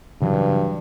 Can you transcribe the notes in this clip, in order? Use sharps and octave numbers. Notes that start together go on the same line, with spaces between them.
G2 C#3 E3 F#3